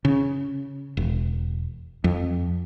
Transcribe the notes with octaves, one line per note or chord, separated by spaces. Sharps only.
C#3
E1
F2